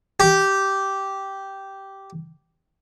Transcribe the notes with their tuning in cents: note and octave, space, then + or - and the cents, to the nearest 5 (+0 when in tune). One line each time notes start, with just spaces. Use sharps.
G4 -10